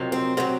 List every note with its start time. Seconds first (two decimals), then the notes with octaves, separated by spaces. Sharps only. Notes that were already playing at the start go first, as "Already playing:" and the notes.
Already playing: F2 C3 D#3 F#3
0.12 C4
0.37 C3 D#3 F#3